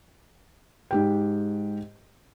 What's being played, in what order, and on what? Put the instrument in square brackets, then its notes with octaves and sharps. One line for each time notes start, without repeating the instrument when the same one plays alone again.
[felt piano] G#2 G4 G5